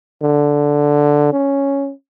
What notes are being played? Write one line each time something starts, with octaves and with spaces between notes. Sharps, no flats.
D3
C#4